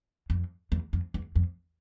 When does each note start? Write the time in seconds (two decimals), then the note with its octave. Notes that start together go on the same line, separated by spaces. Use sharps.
0.30 F2
0.72 E2
0.93 F2
1.14 E2
1.36 F2